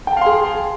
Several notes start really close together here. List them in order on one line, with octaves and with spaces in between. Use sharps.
G5 A5 F5 C6 G#4